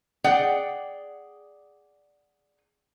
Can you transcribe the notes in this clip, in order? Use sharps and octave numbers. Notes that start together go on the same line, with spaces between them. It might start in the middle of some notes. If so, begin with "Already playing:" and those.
G#4 D5 F#5 G5